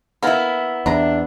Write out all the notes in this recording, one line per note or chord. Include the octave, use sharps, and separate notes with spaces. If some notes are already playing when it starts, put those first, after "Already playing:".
A#3 B3 E4 A#4
E2 C3 D4 A#5